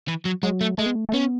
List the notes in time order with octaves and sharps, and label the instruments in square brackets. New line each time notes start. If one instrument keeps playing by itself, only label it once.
[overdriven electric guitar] E3
F#3
[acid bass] F#3 [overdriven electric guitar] G#3
[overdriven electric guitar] A3
[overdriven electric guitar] G#3 [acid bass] A3
[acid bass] B3
A3
A3
[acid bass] B3 [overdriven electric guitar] C#4